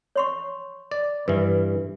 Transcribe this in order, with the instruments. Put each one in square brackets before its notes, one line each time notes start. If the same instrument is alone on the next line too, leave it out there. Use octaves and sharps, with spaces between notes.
[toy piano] C#5 C6 C#6
[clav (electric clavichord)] D5
[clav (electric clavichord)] G2 E3 [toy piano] B4